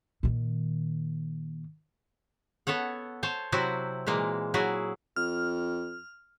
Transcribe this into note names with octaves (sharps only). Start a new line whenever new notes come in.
A#2 D#3
B3 A4 C#5 F#5
C5 C#5 A5
C3 F#3 C4 E4 F#4 F#5
A#2 E3 G#3 A#3
F#3 E4 F#4 G#4
F2 F6